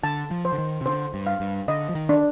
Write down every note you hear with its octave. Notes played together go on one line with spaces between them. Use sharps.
D3 A5
F3
C5
D3
D#3
C3
D3 C5
G2
F5
G2
D3 D#5
F3
D#3
D4